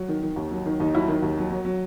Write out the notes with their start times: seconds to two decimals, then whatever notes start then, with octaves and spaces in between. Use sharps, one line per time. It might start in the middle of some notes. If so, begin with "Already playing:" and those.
Already playing: F#3
0.09 D#3
0.23 D#3
0.36 D#2
0.51 F#3
0.66 D#3
0.80 D#2 D#4
0.93 F#3 E4
1.08 D#3
1.22 D#2
1.37 F#3
1.51 F#3
1.65 F#3